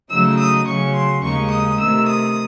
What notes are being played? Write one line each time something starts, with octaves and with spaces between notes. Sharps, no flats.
C#3 F#3 A3 D#4 E6
D#6
C#3 F#3 C#4 C#6
C6
D#2 C#3 G#3 D#4 C#6
D#6
C3 D#3 A3 E6
D#6